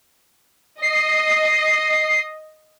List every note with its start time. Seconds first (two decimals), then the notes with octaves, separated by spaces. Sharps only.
0.82 D#5 C7